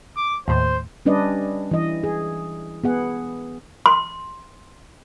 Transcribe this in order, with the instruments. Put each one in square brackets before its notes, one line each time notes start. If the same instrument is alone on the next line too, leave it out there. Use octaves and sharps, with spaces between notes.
[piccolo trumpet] D6
[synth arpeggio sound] D#2 A2 [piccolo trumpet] C5
[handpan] G3 C#4 D4 B4 D5 D#5
E3 D#5
G#4
B3 G#4 F#5
[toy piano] C6